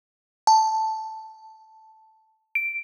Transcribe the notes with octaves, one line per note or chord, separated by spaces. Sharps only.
A5
D7